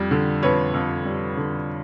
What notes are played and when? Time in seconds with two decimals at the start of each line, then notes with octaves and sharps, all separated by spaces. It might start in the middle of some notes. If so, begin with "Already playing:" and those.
Already playing: F2 G3
0.11 D3
0.43 F2 B4 C#5
0.74 F2
1.05 G3
1.37 D3